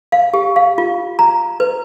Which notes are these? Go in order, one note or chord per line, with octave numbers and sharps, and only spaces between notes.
F5
G4
F5
F4
A#5
B4